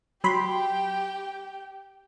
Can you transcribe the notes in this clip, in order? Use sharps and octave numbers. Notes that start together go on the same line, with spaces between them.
F#3 G4 G5 B5 C6